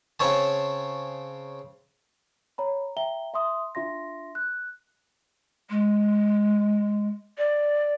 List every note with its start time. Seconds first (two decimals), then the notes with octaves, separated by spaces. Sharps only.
0.20 C#3 C4 C#5 A5
2.58 C#5 A#5 B5
2.97 E5 G5 A#5 G7
3.34 E5 C6 D#6
3.75 D4 F4 E5 C6 A#6
4.35 F#6
5.70 G#3
7.38 D5